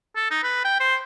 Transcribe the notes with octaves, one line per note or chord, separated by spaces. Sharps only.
A4
D#4
B4
G5
C5